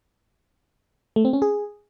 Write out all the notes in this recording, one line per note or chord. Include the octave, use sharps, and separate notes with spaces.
A3
C4
C#4
G#4